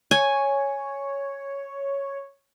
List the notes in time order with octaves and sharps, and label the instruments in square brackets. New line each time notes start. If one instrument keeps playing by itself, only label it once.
[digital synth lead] C#5 [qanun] G#5